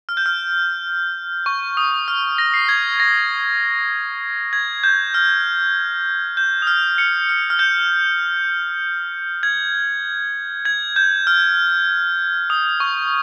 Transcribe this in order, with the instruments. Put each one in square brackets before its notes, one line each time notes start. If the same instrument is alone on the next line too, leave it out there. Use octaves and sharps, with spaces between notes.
[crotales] F6
G6
F6
C#6
D#6
F6
A#6
C7
G#6
A#6
G#6
G6
F6
G6
D#6
F6
C#7
F6
F6
G6
G#6
G#6
G6
F6
D#6
C#6